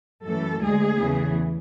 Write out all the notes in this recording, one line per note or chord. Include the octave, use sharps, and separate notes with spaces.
F#2 E3 A3 A4
D2 D3 G#3 G#4
E2 C#3 E3 A3